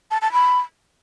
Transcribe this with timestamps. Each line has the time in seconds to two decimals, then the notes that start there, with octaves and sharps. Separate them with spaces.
0.11 A5
0.22 A5
0.33 B5